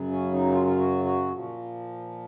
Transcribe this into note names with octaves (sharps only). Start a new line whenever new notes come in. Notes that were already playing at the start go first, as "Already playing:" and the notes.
Already playing: F#2 C#3 F#3
C#4
D#4
F4
F4
F#4
F#4
A#2 F3